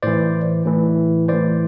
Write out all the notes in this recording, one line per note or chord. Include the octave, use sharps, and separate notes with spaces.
A2 E3 C5 D5
A2 E3
A2 E3 C5 D5